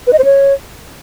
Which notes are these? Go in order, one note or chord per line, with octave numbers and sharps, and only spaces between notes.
B4
D#5
C5
C#5